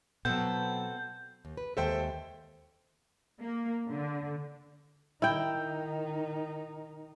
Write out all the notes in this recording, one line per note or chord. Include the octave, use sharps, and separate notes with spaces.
B2 F#3 B3 C4 A4 G6
D#2
B4
D#2 G#3 A4 C5 E5 G5
A#3
D3
D#3 D#4 E4 G5